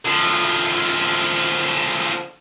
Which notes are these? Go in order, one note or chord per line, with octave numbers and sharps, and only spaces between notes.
D3 F3